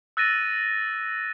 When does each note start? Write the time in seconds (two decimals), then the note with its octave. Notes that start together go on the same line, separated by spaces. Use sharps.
0.17 E6 F#6 A6 A#6 D#7